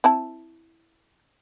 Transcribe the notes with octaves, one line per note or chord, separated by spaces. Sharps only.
C4 E4 A5